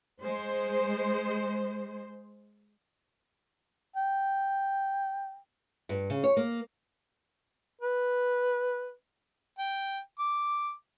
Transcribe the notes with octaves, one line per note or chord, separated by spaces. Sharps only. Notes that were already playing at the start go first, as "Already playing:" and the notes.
G#3 C5
G5
G2
C#3
C#5
A#3
B4
G5
D6